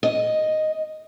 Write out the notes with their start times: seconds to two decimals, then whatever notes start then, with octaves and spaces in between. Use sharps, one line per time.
0.03 D#5